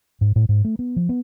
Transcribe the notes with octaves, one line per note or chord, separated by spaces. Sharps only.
G#2
A2
G#2
A3
B3
F3
B3